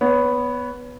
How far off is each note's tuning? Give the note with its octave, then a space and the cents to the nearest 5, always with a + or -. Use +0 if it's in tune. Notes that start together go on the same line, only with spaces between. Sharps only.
B3 +0 C#5 +25